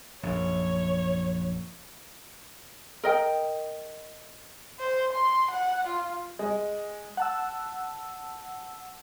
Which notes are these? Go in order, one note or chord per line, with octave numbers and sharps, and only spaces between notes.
A#1 F#2 C#5
A#4 D#5 G5
C5
C6
F#5
F4
G#3
F#5 A5 E6